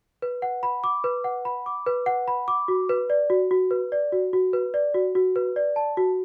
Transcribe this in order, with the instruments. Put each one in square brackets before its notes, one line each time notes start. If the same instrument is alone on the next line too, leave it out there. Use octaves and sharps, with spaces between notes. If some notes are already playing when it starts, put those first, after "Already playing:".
[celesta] B4
F#5
B5
D6
B4
F#5
B5
D6
B4
F#5
B5
D6
F#4
B4
D5
F#4
F#4
B4
D5
F#4
F#4
B4
D5
F#4
F#4
B4
D5
A5
F#4